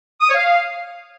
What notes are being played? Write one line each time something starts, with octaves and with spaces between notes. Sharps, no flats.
D#6
C#5
F5